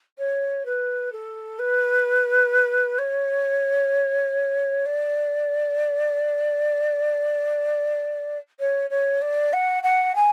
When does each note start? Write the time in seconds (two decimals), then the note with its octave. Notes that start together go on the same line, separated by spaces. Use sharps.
0.18 C#5
0.65 B4
1.12 A4
1.59 B4
2.98 C#5
4.85 D5
8.59 C#5
8.90 C#5
9.21 D5
9.53 F#5
9.83 F#5
10.15 G#5